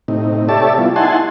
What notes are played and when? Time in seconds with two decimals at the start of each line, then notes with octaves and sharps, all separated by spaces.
0.08 A2 C3 D#4
0.49 G4 A4 C#5 D5 E5 A5
0.78 G3 B3 E4 F4
0.96 D#4 E4 F#5 G#5 A5 C6